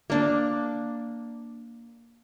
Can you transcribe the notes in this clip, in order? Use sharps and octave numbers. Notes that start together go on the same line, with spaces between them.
A#3 D4